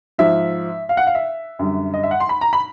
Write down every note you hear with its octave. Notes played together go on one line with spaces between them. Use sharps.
G#2 F3 E5
F5
F#5
F5
E5
F#2 D3 G3
D#5
E5
F#5
C6
B5
A#5
B5